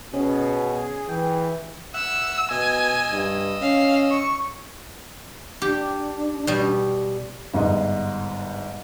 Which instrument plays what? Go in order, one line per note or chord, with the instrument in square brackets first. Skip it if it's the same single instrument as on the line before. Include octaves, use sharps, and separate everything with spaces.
[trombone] B2 [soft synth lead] C#4 [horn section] G#4
[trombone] E3 [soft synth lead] G5
[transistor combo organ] E5 F#5 [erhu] E6
[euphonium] B2 [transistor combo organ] D#5 E6 [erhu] G#5
[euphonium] G2
[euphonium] C#4 [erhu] F5
[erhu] C#6
[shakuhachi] D4 [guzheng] G4
[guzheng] B2 G3
[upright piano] G1 G#2 D#5